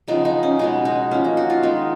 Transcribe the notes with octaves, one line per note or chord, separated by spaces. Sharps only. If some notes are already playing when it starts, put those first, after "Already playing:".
C#3 F3 B3 D#4
D#4
C#4
B2 G#3 B3 D#4
D#4
F3 A#3 C#4
D#4
F#4
F4
D#3 G#3 B3 D#4